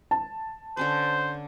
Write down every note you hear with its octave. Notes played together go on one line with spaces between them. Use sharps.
A5
D3 C#4 B4 C5